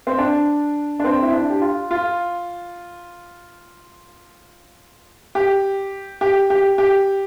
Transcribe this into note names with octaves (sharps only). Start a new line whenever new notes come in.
C4
D4
D4
C4
E4
D4
G4
F4
F4
G4
G4
G4
G4